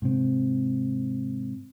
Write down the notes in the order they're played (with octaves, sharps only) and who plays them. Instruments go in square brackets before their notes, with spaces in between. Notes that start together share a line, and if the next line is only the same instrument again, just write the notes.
[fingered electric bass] G#2 C3 C4